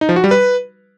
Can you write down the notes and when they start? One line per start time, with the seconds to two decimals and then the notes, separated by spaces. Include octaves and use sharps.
0.01 D#4
0.09 F3
0.16 F#4
0.24 G3
0.31 B4